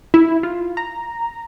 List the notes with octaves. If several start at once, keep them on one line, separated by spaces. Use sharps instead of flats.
E4
F4
A#5